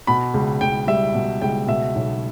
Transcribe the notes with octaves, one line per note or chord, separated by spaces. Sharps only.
B2 B5
C#2
C#2 G5
G3 E5
B2
C#2 G5
B2 E5
B1